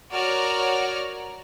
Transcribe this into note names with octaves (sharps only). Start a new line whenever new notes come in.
F#4 A#4 C#5 D5 F6